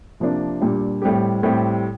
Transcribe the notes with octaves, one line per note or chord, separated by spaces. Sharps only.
C3 F3 A#3 D4
A#2 G3 D4
A2 G3 C4 G4
A2 G3 C4 G4